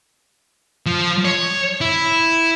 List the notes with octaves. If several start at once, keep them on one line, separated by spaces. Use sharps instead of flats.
F3
C#5
E4